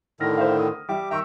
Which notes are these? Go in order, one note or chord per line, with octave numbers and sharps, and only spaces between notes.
A2 D3 D#3 F6 A#6
C5 E5 F5
D#6
G3 G4 E5 D6
D#3 E5 G5 A#5 C#6 E6